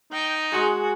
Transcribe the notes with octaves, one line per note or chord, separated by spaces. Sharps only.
D#4 G5
G#3 F#4 G#4